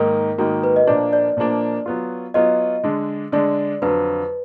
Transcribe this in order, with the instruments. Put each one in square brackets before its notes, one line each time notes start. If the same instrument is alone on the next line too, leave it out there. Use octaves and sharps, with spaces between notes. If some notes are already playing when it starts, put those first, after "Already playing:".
Already playing: [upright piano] G#2 D#3 A#3 D#4 [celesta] A#4
[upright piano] G#2 D#3 A#3 D#4 [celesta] F#4
[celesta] B4
D#5
[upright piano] A#2 F3 A#3 D4 [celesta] D5
[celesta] D5
[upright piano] A#2 F3 A#3 D4
F#3 B3 F4
[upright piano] F#3 B3 F4 [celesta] D#5
[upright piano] D3 G#3 D4
[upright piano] D3 G#3 D4 [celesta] D5
[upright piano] F2 D3 F#3 [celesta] B4